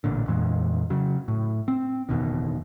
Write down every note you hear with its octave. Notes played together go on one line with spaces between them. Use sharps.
A1 A#2 D3
F2 A#2 E3 G#3
C#3 F#3
A2
C4
F#1 E2 B2 D#3